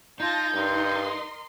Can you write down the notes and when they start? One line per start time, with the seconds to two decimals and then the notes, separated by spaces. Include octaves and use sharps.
0.20 D#4 F4 A5 G6 A#6
0.54 G2 A#4 D#5 C6